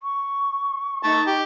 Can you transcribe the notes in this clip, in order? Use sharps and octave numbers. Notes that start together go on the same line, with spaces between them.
C#6
D#4 A5 C#6
G4